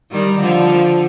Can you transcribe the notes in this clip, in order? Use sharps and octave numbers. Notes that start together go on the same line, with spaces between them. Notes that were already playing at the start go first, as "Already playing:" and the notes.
D#3 G3
D3 F3